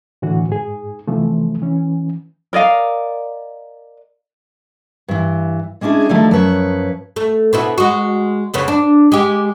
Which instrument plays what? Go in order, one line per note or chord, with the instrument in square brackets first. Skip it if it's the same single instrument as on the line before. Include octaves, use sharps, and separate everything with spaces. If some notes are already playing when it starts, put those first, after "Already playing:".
[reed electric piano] A2 D3 E3 F#4
G#2 G#4
C3 E3 F3 A3
E3 C#4
[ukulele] A#4 D5 D#5 F5
[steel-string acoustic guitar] G2 E3
G#3 C#4 D4 E4 G#4
D3 D#3 F3 G3 A3
F#2 F3 B4 C#5
[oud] A3
B2 B3 E4
G#3 F#4
F2 C#3 B3
D4
G#3 G4